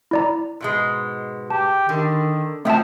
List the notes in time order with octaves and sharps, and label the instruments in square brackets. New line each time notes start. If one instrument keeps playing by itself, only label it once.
[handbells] E4 D5 A#5
[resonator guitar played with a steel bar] G#2 B2 G#3
[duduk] G4 [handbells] A5
[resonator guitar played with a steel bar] D3 [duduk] D#3
[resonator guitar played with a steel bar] F3 F#3 [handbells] A3 E5 A5 [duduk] C4